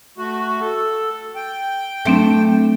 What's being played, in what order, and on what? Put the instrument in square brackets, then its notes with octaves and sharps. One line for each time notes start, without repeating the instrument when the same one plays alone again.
[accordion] A3 F#4
A4
G5
[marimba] F#3 C4 D4 [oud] A3